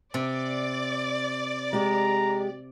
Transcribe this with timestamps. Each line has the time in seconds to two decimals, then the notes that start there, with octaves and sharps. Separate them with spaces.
0.14 C3 D5
1.73 G#3 G4 A#5